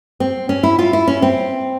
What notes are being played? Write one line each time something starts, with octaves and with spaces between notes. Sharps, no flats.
C4
C#4
E4
F4
E4
C#4
C4